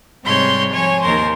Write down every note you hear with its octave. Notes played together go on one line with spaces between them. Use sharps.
G#2 C3 G3 C#5 C6 G6
F3 C#5 G#5 C#6
D#2 A#4 C5 C6